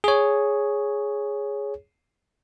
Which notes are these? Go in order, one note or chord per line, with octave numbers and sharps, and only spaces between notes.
G#4 C#5